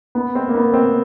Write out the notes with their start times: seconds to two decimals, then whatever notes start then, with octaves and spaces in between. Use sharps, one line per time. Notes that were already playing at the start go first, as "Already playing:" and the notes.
0.15 B3
0.35 C4
0.48 A#3
0.54 B3
0.74 C4